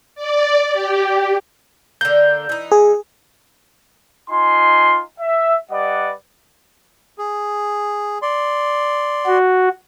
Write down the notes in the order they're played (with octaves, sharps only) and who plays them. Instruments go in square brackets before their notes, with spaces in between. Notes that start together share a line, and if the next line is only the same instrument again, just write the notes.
[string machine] D5
G4
[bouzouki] D3 A#3 [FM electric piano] G6
[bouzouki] E3 D#4
[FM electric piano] G#4
[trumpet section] D#4 F4 G#5 C6
E5
G3 B4 D5 D#5 F#5
[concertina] G#4
D5 C6
[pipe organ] F#4